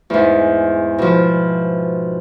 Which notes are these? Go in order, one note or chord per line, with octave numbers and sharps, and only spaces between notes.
E2 G#2
B2 F3